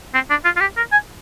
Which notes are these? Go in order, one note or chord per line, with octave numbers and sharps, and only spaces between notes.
C4
D4
F4
F4
G4
A#4
G#5